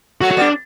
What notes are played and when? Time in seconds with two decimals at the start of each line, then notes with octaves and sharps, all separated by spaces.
0.21 F#3 A3 F#4
0.31 F#4
0.37 G3 B3 D4